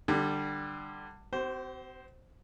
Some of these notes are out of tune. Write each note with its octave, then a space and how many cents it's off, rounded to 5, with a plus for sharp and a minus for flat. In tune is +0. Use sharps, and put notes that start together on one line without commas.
D3 +20 G3 +0
C4 -35 F#4 +45 C5 +0